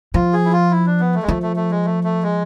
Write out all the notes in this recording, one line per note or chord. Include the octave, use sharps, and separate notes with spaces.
F3 F4
G#4
E4
F4
E4
D4
B3
A3
G#3
F3 A3
A3
A3
G#3
A3
A3
G#3